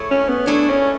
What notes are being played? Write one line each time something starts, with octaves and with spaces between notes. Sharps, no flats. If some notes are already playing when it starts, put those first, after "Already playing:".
Already playing: A3 E4 G#4 C#5
C#4
B3
A3 D4 E4 G#4 C#5
C#4